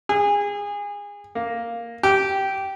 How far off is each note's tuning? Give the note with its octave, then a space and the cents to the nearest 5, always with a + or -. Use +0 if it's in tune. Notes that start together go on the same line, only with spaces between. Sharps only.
G#4 -25
A#3 +0
G4 -15